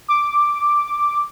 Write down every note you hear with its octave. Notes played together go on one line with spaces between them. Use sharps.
D6